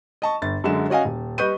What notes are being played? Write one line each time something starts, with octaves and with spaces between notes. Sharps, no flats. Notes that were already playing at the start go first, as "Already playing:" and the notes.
D#5 A5 C#6
G1 A6
F#2 D3 G#3 E7
C#4 F#4 D#5 F5 G#5
D#1
G3 B4 D#5 C#6 G6 D#7